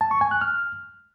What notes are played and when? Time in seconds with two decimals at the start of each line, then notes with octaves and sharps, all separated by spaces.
0.01 A5
0.11 C#6
0.21 G#5
0.31 F#6
0.41 F6